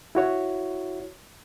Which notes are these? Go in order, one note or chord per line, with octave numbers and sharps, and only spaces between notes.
E4 F#4 C#5